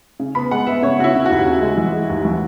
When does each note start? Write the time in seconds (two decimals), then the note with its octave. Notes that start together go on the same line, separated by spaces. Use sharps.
0.20 C#3
0.35 B3 B5
0.51 G#3 F#5
0.67 B3 E5
0.82 C#3 C#5
0.99 C#3 F#4
1.04 E4
1.14 C#3
1.25 F#4
1.31 D#2
1.46 C#3
1.61 G#3
1.78 E3
1.93 G#3
2.09 D#2
2.25 E3